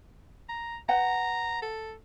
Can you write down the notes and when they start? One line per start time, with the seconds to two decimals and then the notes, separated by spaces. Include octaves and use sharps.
0.49 A#5
0.89 B4 F#5 G5 A#5
1.62 A4